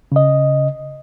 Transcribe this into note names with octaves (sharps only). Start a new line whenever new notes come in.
C#3 D#5